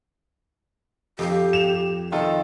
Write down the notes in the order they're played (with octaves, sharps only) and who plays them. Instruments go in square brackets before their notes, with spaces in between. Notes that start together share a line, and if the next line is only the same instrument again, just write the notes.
[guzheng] F2 F3 [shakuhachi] G4
[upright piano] E7 F7
[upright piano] D#3 F4 A4 [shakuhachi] D#5